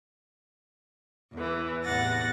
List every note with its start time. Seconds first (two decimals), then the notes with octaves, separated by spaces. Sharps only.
1.34 E2 E3
1.85 E2 A2 C3 F#5 A6 A#6